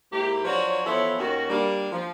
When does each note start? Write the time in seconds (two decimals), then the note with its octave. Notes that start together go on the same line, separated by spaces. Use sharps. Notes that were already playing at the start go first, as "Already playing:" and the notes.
0.13 G#2 A#3 E4 G4
0.45 F3 F#3 D4 F#4 B4 C#5
0.85 E3 F3 B3 E4 A4 C#5
1.18 D#2 D#3 C#4 F#4
1.49 G3 A#3 D4
1.91 F3